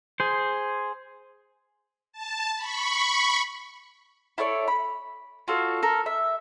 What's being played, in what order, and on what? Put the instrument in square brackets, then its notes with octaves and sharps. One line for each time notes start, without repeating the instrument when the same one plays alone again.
[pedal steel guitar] G#4 C5
[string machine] A5
B5 C#6
[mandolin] E4 A4 C#5 D5
B5
F4 F#4 A4 C#5
A4 A#4
E5